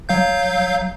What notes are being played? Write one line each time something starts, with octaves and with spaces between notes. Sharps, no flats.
F#3 F5 G6